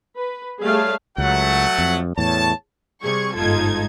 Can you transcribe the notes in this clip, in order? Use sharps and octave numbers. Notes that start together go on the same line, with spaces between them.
B4
G3 A3 G#4 C#5 F5 A5
C#2 F#3 A3 F#5
F2
E2 A2 C#5 A5
C3 G3 G#4 C#6 G#6
G1 G#2 D#4 F4 A4 G#6